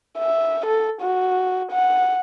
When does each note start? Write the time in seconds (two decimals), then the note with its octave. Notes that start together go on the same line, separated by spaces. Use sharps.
0.18 E5
0.66 A4
1.01 F#4
1.71 F#5